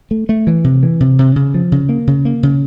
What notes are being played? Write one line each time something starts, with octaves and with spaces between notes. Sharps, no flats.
A3
A3
E3
C3
E3
C3
C3
C#3
F3
C#3
A#3
C#3
A#3
C#3